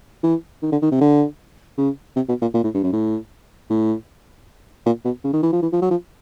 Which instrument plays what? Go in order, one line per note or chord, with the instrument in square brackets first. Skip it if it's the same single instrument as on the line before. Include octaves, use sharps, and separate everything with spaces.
[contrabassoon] E3
D#3
D3
D#3
C3
D3
C#3
C3
B2
A#2
A#2
A2
G2
F#2
A2
A2
A#2
B2
C#3
D#3
E3
F3
E3
F3
F#3
F3